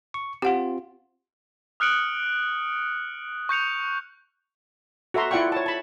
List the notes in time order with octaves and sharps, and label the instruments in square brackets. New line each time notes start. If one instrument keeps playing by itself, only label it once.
[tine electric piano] C#6
[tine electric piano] C4 F4 [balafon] G4 F#5
[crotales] D#6 F6 F#6 C#7 D7 F#7
C#6 G6 C#7 F7
[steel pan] F#4 A4 E5 A#5 C6
E4 F4 D5 F#5 G5 C#6
C#5 A5
A5 B5